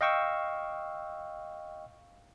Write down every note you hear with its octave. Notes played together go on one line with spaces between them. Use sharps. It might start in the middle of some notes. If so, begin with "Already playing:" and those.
D#5 F5 G5 C#6 E6